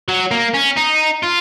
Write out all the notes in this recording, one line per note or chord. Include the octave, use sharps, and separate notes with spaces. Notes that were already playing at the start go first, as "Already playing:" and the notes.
F#3
A#3
C#4
D#4
F4